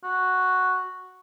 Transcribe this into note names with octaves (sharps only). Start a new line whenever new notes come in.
F#4